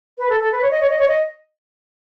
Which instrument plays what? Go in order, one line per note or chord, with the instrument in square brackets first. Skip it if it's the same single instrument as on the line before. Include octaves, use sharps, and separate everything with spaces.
[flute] B4
A4
A4
B4
C#5
D#5
C#5
D#5
C#5
D#5